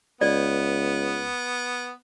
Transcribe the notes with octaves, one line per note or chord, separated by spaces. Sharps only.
C#2 B3 D5